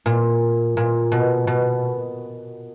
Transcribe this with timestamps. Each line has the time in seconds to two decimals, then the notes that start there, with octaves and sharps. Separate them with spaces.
0.06 A#2
0.77 A#2
1.12 B2
1.47 B2